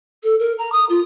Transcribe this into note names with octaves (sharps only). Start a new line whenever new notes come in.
A4
A#4
A#5
D#6
F4